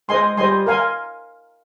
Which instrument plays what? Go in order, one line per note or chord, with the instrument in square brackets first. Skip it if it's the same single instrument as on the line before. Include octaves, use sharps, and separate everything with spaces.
[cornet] G#3 [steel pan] C5 D#5 G#5 C6
[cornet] G3 [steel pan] C5 D#5 G#5 C6
[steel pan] A#4 F5 G#5 C6